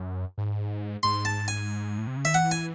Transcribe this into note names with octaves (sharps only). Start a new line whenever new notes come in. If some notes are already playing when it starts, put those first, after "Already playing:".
Already playing: F#2
G#2
G#2 C6
A5
G#5
A2
C3
C#3
D#3 E5
E3 F#5
G#5